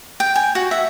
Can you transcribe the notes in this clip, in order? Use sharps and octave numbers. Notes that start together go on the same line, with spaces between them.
G5
G#5
F#4
E5